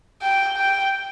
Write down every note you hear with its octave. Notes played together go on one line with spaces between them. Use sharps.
G5
G5